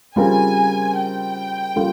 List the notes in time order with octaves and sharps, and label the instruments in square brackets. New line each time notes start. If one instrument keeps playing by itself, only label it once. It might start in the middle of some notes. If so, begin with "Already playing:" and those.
[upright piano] C#3 G3 C4 F4 A#4 [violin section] G#5
[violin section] G5
[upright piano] C#3 G3 A#3 C#4 F4